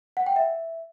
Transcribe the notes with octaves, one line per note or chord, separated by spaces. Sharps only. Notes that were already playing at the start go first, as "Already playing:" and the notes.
F#5
G5
E5